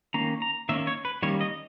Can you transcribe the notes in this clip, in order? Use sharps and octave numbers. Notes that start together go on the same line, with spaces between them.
D#3 A#3 C#4 A#5
A#5
D#3 A#3 C#4 E5
C#5
B4
D#3 G3 A#3 C#4 C#5
D#5